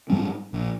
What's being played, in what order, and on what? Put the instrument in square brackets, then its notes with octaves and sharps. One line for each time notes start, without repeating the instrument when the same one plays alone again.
[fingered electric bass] G#2 G3 C4
A#1